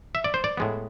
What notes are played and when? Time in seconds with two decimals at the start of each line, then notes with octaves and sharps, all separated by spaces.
0.15 E5
0.24 D5
0.34 C5
0.44 D5
0.57 A2 G#3 B3